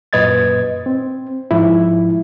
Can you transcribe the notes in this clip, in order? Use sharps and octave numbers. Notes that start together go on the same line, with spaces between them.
F#2 A#2 B4 D#5 G#6 A6
C4
G#2 F3 E4